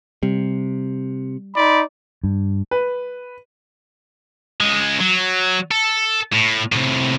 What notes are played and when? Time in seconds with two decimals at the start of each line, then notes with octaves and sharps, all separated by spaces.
0.23 C3 G3
1.56 D#4 D5 B5 C6
2.24 G2
2.71 B4
4.60 C#2 G#3
5.00 F#3
5.71 A4
6.33 A2
6.72 A2 C3